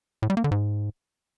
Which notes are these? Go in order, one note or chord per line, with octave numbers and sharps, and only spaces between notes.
A2
G3
A#3
D3
G#2